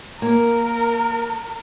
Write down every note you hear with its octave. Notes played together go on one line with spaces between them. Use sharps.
A#3 A#4